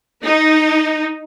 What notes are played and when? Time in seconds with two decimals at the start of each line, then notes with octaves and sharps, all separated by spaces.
0.25 D#4